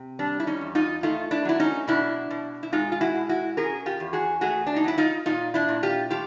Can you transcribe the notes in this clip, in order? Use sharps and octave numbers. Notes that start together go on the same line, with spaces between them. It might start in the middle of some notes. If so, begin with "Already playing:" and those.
Already playing: C3
G3 D4
E4
C#4 D#4
E2
D#4 F4
A3 D#4 F4
D4 E4
F#3 E4
C#4 D#4
B2 D4 E4
B2
E4
G#3 D#4 F4
F4
E4 F#4
B2
E4 F#4
C#4 G#4 A#4
F4 G4
E2
F#4 G#4
A3 F#4 G#4
D4
D#4
F#3 E4
D#4 F4
A#2 D#4 F4
D4 E4
A#2
F4 G4
A3 F4 G4